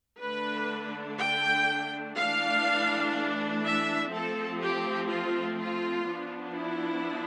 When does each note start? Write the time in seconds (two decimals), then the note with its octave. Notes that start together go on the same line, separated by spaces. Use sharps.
0.22 D3 A3 D4 B4
1.19 G5
2.17 E3 A3 D4 F5
3.64 E5
4.11 F3 A3 C4 A4
4.60 G4
5.09 F4
5.58 F4
6.06 F3 B3 D4
6.55 E4